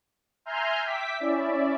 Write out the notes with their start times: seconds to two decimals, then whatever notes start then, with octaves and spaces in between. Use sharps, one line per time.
0.45 E5 G#5 A#5 C6 F6 G6
0.85 E5 G5 D6 B6
1.20 C#4 E4 D5 E5